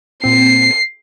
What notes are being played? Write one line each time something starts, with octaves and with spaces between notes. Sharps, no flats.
A#2 C4 C7